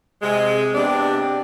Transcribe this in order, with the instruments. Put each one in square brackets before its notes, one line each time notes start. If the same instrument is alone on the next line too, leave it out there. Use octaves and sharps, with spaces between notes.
[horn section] C3 G#3
[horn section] C3 B3 D4 [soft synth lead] G4